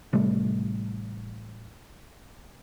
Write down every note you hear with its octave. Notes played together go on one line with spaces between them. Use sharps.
A1 C3 G3 A3